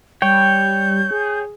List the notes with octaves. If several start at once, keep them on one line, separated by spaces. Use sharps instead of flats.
G3 C#5 G5 G6
G#4